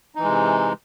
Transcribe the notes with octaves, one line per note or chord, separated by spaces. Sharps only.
C3 E3 G#3 D#4